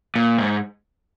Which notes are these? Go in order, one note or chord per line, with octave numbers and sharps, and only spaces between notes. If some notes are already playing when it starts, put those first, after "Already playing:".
A#2
G#2